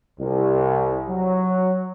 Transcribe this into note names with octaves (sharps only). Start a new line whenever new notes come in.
C2
F#3